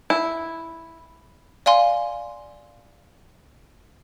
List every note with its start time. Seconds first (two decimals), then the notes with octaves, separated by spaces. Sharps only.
0.10 E4
1.66 D5 F5 G#5 C6